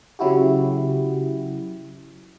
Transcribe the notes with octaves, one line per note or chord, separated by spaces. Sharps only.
C#3 F#3 E4 F#4 G4